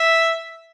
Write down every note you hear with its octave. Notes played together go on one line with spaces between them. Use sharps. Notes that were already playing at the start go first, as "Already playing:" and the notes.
Already playing: E5